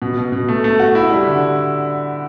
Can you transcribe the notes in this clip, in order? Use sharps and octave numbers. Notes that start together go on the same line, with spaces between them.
B2
B2
B2
A3
A3
F#4
E4
G3
D3